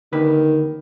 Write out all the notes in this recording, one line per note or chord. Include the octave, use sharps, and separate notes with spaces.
D#2 D3 D#3 B4